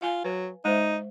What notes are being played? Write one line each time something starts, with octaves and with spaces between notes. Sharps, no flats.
F4 F5 G#5
F#3 B4
G#3 D#4 C5 E5